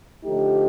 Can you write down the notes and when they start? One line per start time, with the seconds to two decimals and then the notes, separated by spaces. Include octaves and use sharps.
0.25 D3 F3 A3 D#4 G4